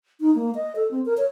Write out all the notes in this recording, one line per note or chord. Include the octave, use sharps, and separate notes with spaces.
D#4
A#3
D#5
A4
C4
A#4
C#5